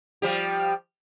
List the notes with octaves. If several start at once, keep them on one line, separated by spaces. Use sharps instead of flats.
F3 G3 G4